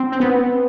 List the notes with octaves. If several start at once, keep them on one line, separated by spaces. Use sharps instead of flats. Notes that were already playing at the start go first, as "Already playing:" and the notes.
Already playing: C4
C4
B3